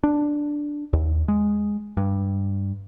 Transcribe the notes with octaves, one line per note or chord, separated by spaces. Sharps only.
D4
D#2
G#3
G2